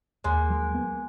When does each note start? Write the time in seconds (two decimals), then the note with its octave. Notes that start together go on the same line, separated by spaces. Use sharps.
0.24 D#2 G#3 A#3
0.50 F#3
0.74 B3